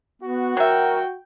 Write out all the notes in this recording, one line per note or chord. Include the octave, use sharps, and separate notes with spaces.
B3 F#4
F#3 A#4 E5 G5